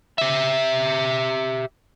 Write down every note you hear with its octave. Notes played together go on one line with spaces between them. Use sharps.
G4 E5